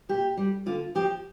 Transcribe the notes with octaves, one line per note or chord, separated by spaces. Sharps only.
A#2 G4
G3
D3 F4
F3 G4